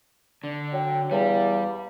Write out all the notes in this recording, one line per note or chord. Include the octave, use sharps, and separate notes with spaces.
D3 D5
F#3 G5
E2 G3 F5